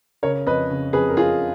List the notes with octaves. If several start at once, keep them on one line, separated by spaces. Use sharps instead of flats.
C#3 A#4 C#5
F2 B4 D#5
C#3
F2 G#4 B4
A#4
F2 F4 G#4